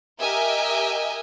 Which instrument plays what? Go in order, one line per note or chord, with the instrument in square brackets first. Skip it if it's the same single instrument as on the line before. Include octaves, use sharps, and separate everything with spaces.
[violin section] G4 A#4 D#5 E5 G#5